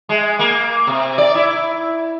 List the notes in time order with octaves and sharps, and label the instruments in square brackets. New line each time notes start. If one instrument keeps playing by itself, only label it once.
[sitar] G#3
A#3
C3
D5
E4